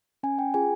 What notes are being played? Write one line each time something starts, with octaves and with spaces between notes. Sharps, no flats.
C#4 G#5
G5
F4 G#4 G#5